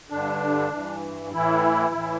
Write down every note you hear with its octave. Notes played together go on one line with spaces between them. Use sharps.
G2 D3 D4
G2 E3
A2 E3 E4
A2 E3